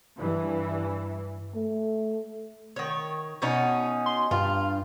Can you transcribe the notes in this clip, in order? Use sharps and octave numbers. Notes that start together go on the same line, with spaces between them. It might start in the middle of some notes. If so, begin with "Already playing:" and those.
G2 E3
A3
D#3 C#5
B2 C#4 D#4
C6
G2 F4